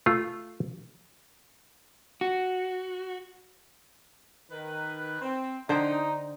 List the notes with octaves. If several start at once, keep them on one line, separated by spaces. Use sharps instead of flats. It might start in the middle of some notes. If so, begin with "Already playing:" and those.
A3 F4
F#4
D#3 B4
C4
D3 D#4 C5 G5